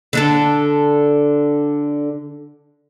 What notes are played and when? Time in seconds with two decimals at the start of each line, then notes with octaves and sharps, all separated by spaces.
0.13 D3 D4 A4